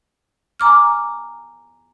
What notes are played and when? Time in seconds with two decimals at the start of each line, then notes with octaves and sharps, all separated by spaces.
0.60 G#5 A#5 D6 F6